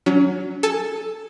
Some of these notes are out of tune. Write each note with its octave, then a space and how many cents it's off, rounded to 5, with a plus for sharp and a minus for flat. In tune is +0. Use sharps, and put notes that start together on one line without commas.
F#3 +0 C#4 +35
A4 +0 G#5 +0